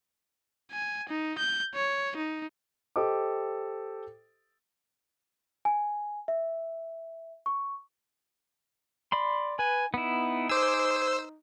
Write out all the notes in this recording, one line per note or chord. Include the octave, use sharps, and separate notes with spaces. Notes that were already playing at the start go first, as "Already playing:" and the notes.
G#5
D#4
G6
C#5
D#4
G4 A4 C5 D#5 D6
G#5
E5
C#6
D5 B5 C6
B4 G#5
B3 D#4 E4
G#4 C5 D6 E6